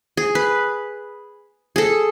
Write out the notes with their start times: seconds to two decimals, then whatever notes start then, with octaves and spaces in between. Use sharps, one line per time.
0.17 G#4
0.35 B4
1.76 G#4 A4